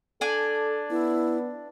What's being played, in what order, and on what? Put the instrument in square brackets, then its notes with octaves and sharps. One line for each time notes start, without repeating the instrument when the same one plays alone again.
[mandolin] D4 D5 G#5 [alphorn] A4
[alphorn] B3 [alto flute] E4